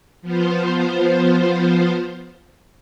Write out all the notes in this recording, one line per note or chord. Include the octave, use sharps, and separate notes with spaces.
F3 B3 F4 C5